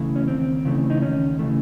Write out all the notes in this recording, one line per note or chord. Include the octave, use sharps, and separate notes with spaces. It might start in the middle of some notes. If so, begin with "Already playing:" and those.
Already playing: C#3 E3 A3
C#4
D#2 C4
C#3 E3 A3
D#4
D#2 C#4
C#3 E3 A3